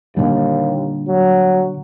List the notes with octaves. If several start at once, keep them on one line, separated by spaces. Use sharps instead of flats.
D#2 A#2 D3 G3
F#3